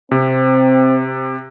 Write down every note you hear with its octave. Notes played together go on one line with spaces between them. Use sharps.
C3 C4